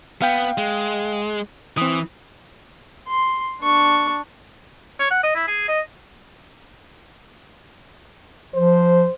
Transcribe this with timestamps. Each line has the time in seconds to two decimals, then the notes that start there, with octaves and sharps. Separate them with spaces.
0.22 B3 F5 G5
0.58 G#3
1.77 E3 C4 D#6
3.08 C6
3.61 D4 C#6
5.00 C#5
5.11 F#5
5.23 D#5
5.35 E4
5.48 G#4
5.68 D#5
8.54 F3 C5